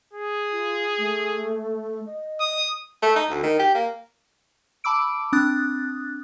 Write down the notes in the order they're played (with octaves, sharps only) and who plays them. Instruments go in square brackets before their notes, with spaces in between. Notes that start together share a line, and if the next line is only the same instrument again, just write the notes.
[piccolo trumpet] G#4
[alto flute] F4
A3
D#5
[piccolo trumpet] D#6
[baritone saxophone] A3
D#4
D2
D#3
G4
A#3
[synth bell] A5 B5 D6 E6 D7
C4 D4 D#6 F#6 A6